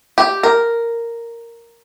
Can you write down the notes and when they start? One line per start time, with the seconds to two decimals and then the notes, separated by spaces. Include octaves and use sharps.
0.18 G4
0.43 A#4